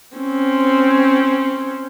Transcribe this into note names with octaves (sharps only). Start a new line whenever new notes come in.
C4 C#4